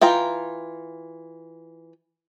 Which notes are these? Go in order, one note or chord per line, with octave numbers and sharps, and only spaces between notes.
E3 F4 G5 A#5